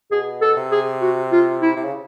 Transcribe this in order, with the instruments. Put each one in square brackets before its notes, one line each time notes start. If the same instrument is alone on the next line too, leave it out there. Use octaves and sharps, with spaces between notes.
[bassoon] B2 [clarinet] G#4
[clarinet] A4
[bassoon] C3
[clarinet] G#4
F#4
F4
E4
[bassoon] C3
C#3